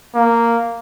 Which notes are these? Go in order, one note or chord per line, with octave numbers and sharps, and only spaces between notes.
A#3